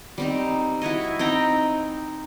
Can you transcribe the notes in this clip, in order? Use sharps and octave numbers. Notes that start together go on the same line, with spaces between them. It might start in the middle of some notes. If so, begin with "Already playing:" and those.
G3 C4 D#4
E4 F#4 C#5 D#5
C4 D#4 G5 A#5